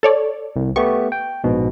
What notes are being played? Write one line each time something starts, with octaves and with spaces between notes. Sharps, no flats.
A4 C#5 D5
C2
A3 B3 G4 C#6
G5
A#1 G#2 B2